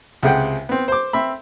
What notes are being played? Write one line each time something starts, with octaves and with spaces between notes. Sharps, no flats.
C#2 C3 G#4 F#5 G5
B3 C4
C5 D6
C4 E5 B5